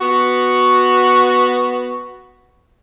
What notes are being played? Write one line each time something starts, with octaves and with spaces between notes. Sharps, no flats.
B3 F#4